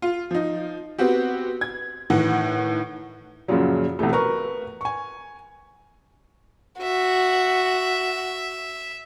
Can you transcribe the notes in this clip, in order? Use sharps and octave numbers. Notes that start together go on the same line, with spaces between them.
F4
F3 D#4
B3 C4 F#4 G4
G#6
A2 D#3 E3 F#5
F#2 A#2 C#3 F3 F#3
B1 C3 E3 A3
A#4 B4 A#5 C#6
G#5 C#6
F#4 E5